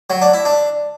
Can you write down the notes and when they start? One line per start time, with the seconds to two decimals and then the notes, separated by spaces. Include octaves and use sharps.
0.10 F#3
0.22 D4
0.33 E4
0.45 D4